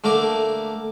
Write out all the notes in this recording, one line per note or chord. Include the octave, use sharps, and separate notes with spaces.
D3 A3 A#3 A#4 D6